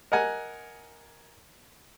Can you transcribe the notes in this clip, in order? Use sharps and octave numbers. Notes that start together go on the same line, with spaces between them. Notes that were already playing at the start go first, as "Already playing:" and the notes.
A#4 D#5 F#5 G#5